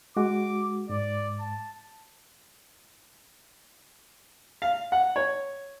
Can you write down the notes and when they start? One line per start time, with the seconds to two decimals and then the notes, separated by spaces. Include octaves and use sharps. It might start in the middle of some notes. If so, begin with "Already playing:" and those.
0.17 G#3 F#4 D6
0.90 G#2 D5
1.40 A5
4.62 F5
4.92 F#5
5.16 C#5